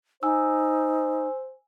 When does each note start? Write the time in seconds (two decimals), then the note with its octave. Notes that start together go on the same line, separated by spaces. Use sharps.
0.23 D#4 C5 G#5 E6